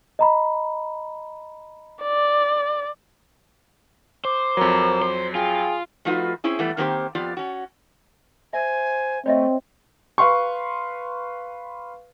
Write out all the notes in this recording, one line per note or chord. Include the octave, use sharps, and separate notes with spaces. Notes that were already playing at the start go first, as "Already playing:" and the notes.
D#5 A#5 B5
D5
C5 D6
F2 F#3 A#4
C5
F4 G#4 G5
F3 A3 D#4 F4 F#4 B4
C4 C#4 E4 G#4
E3 G3 A3 B3
D#3 A#3 C4 G4 C5
F2 B3 F4 G4 D5
C#4 F#4
C5 E5 G#5
A3 C4 C#5 D#5 E5
B4 F5 C6 C#6